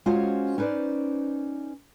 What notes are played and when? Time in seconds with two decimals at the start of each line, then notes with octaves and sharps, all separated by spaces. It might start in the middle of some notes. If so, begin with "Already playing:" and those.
0.06 G#3 C#4 F4 F#4 C5 C#5
0.58 C#4 D#4 B4 C5 D5